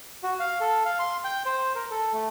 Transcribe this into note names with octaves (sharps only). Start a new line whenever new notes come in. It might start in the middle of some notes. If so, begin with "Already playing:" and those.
F#4
F5
A4
F5
C6
G5
C5
A#4
A4
A3